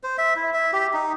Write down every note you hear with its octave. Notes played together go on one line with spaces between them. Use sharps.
C5
E5
E4
E5
G4
D#4